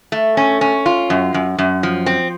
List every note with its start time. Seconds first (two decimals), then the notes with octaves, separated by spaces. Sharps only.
0.12 A3
0.37 C#4
0.61 C#4
0.86 F4
1.10 F#2
1.34 F#2
1.58 F#2
1.83 F3
2.06 C4